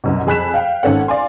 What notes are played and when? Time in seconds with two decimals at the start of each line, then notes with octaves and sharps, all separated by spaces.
0.04 C2 F#2 B2
0.27 F2 G#4 B5 F#6 B6 E7
0.54 F5 G5
0.83 G#1 D#3 C#4 A4 F#5
1.08 D5 F5 G#5 C6